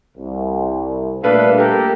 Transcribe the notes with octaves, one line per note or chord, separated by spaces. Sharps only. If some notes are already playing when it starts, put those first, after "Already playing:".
C2
A#2 G3 A3 D4 A4 B4 F5
G4 A4 A#4